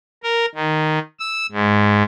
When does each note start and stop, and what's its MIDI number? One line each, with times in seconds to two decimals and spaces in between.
0.23 0.46 70
0.55 0.99 51
1.20 1.46 88
1.52 2.03 44